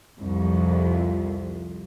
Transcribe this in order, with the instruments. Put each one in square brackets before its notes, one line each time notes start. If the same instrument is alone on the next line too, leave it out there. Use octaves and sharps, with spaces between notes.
[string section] C2 F2